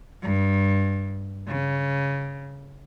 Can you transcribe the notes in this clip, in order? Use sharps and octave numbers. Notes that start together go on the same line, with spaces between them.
G2
C#3